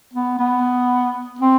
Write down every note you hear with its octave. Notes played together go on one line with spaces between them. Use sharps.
B3
B3
C4